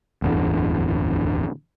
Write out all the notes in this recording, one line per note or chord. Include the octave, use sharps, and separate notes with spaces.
D1 G1 E2 D3